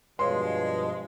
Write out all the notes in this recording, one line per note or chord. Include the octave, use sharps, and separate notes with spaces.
G2 B2 F3 G#3 B4 C#5 F5 C6